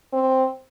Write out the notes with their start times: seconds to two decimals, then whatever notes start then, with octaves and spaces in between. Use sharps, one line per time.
0.13 C4